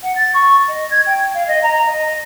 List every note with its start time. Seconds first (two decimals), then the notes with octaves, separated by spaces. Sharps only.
0.03 F#5
0.16 A6
0.34 C#6
0.68 D#5
0.90 G#6
1.06 G5
1.34 F5
1.48 D#5
1.63 A#5
1.86 D#5